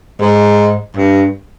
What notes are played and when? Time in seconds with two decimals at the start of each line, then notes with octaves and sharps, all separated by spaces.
0.20 G#2
0.96 G2